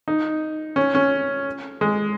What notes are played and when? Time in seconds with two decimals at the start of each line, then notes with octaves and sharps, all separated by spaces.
0.08 D#4
0.76 C#4
0.95 C#4
1.81 G#3